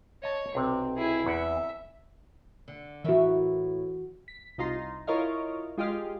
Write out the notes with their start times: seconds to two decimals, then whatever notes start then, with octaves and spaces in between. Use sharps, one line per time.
0.23 C#5 D#5 A5
0.55 B1 C3 C4 G5
0.97 E4 G#4
1.26 E2 E5 F#5
2.68 D3
3.04 A2 E3 F#4 A#4 E5
4.28 B6
4.58 C2 D#4 F4 A#5 C6
5.07 E4 F4 A#4 C#5 D#5 F5
5.78 G#3 F4 G4 G#4 D#5 F5